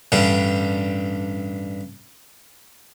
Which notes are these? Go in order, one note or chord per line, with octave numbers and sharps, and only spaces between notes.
A1 G2 D3 G3